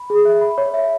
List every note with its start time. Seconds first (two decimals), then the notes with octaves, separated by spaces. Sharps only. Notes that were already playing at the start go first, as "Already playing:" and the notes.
Already playing: B5
0.10 G#4
0.25 E5
0.41 B5
0.58 C#5
0.74 E5